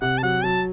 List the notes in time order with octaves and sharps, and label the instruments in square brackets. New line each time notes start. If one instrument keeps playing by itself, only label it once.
[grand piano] C3 [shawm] F#5
[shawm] A5
[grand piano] F#3 [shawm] F#5
[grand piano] F#3 [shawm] A5